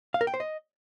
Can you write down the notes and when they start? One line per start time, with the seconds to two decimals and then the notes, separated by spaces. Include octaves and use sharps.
0.14 F5
0.21 A#4
0.27 G5
0.34 C5
0.40 D#5